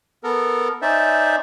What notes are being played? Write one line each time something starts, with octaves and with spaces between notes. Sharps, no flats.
B3 A4 A#4
C#4 D#4 C5 D5 E5